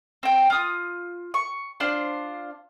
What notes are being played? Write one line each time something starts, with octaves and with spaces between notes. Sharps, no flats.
C4 G5
F4 D#6
C#6
D4 F4 C5